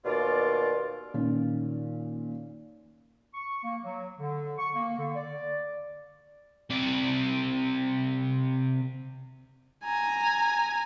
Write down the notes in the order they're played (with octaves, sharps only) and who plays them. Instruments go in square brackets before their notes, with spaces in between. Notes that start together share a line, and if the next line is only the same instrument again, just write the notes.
[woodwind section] D#2 B2 F4 D5
[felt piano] A#2 D#3 C#4
[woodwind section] C#6
A#3
F#3
D3
C#6
A#3
D3
D5
[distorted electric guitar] C3 D5
[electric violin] G#5 A#5